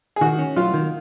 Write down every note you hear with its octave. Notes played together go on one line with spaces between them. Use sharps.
G#4
D#3 F#4
C#4
F#3 F4
D#3